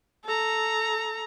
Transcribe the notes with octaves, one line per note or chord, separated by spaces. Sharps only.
A4 A#5